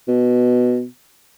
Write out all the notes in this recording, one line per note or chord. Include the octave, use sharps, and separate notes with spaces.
B2